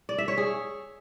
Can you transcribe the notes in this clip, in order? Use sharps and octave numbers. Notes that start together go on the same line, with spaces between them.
D5
E5
C#5
G#4